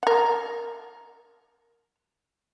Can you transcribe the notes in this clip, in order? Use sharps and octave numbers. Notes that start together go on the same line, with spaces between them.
A#4 F#5